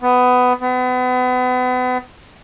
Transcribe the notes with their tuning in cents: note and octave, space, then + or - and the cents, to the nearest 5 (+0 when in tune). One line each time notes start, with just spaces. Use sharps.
B3 +15
B3 +35